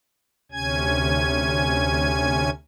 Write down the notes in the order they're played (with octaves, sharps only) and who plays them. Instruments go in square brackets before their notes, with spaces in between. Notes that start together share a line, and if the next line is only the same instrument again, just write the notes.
[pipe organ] D2 C3 C#4 G#5 G#6